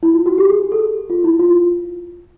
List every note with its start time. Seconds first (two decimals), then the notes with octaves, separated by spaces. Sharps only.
0.03 E4
0.14 F4
0.26 F#4
0.38 G4
0.50 G#4
0.72 A4
1.10 F4
1.24 E4
1.39 F4